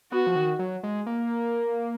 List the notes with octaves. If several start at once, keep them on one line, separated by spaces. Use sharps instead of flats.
B3 F#4
F3
D#3
F#3
G#3
A#3